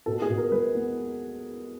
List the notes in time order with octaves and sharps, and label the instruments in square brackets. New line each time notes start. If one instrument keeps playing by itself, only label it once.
[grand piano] B2 A4
G#4
B2
A#4
G#3 B4
B3